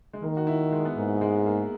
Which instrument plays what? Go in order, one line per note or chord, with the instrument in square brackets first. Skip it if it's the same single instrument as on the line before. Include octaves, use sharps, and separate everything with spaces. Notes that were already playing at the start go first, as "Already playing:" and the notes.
[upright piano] G#3
[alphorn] D#3 [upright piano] A#3
[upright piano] F#4
E4
G#3
B3
[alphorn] G#2 [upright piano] A#3
[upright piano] G#3
A#3